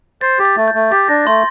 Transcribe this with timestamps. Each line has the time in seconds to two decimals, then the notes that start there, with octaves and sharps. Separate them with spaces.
0.21 C5 A6
0.39 G4
0.45 A6
0.57 A3
0.68 G6
0.74 A3
0.91 G4 A6
1.09 D4 A#6
1.26 A3 C6